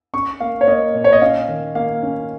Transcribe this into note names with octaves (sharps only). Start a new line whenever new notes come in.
C#4 C#6
A#3 F5
C#5
A#3 D#5
A#2
C#5
D#5
C#4 F5
D#3
A#3 F5
C#4